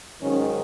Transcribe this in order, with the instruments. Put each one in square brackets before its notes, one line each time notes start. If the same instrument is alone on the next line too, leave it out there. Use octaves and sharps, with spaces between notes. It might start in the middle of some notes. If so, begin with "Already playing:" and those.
[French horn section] G#2 D#3 F#3 C#4